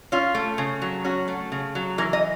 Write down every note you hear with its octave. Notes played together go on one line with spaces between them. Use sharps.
C#4 F4
A3
C#3
F#3
C#4 F#4
A3
C#3
F#3
E3 A#4
D#5